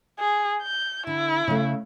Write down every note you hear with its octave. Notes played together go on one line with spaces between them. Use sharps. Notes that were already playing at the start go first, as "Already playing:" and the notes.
G#4
G6
D3 E4
C#3 A3